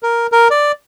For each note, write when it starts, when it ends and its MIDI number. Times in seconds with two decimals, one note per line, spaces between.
0.03 0.27 70
0.32 0.48 70
0.51 0.72 74